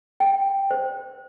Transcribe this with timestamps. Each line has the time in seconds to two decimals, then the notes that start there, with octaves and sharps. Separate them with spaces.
0.20 G5
0.71 C5